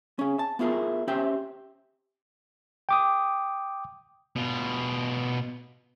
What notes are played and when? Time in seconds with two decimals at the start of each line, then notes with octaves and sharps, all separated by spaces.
0.19 C#4 G#4
0.39 A5
0.59 B3 E4 F4 G#4 A#4
1.08 C#4 G4 C5 E5 G5
2.89 G5 D6 D#6
4.36 B2 F4